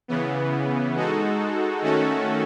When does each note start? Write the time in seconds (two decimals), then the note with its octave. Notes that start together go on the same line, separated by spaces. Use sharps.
0.08 C#3 E3 B3
0.95 G#3 D#4 F#4 A4
1.82 D#3 A3 C#4 F#4 A4